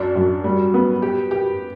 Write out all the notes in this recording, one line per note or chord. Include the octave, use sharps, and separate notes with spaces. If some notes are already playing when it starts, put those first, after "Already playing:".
Already playing: F#2 D4
F#2
G3
B3
G4
G4